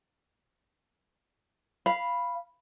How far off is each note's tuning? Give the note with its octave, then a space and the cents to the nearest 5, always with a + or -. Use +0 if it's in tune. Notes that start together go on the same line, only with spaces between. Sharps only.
F5 -10 B5 +0